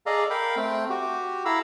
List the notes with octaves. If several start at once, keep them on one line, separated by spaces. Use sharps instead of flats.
G#4 A4 D5 D#5 F5 A#5
A#4 F5 G5 B5
A3 C4 G5
F#4 G4
E4 A4 F5 A#5 B5 E6